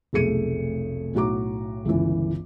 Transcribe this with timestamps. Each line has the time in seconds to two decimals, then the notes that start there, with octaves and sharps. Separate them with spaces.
0.13 F1 B1 A3 G#4 C#7 D#7
1.14 B1 A2 F#4 A#5 D6
1.85 G1 C#2 E3